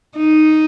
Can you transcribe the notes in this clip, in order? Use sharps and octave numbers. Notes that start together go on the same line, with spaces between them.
D#4